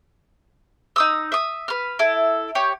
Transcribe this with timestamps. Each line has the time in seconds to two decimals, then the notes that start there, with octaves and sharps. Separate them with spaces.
0.96 D#4 D#6 E6
1.32 E5 D#6
1.68 B4 F6
1.99 E4 A4
2.55 G4 C#5